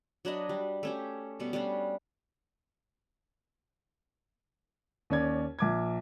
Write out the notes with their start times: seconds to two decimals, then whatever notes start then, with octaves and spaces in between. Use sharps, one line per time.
0.25 F#3 D4 B4 D#5
0.49 G3
0.83 A3 C#4 G4
1.40 B2 G3 B3
1.53 G3 B3 C#4 D4
5.10 D#2 C#4 D5 G#6
5.59 A#1 D6 G#6